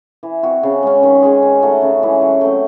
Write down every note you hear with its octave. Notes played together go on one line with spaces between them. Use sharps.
E3
C4 F#4
C#3
G#3 C#4
D#3
G#3 C#4 G#4
D#3
A3 D#4 F#4
C#3
E3 G#3 C#4
F#3
A3 C4 F#4